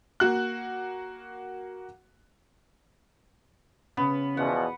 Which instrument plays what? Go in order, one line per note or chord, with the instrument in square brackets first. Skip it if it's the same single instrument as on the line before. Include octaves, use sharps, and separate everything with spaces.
[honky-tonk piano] A#3 F#4 F#6
[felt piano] C#3 C#4 [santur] B3
[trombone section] E2 B2 F3 [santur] F#5